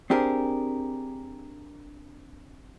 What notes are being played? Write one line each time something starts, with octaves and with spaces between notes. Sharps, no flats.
C4 D4 G4 G#4 A#4